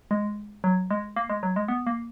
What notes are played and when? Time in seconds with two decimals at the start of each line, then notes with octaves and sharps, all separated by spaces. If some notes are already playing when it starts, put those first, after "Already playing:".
0.11 G#3
0.64 F#3
0.91 G#3
1.16 A#3
1.30 G#3
1.43 F#3
1.56 G#3
1.68 B3
1.87 A#3